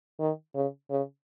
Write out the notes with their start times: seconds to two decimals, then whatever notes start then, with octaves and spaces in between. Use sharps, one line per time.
0.20 D#3
0.55 C#3
0.90 C#3